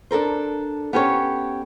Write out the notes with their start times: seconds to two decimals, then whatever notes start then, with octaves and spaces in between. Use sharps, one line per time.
0.11 D4 A4 A#4 C5
0.93 B3 C#4 G4 A4 C5 C#5